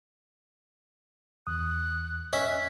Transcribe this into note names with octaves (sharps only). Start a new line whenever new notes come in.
E2 D#6 F#6
C#4 D#5 E5 B6